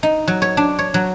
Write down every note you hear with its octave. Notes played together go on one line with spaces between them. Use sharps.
D#4
F#3
C#5
D4
C#5
F#3